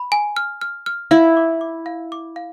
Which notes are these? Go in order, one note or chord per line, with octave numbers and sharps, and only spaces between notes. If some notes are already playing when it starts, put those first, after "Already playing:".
Already playing: B5
G#5
F6
F6
F6
E4 F5
D6
D6
F5
D6
F5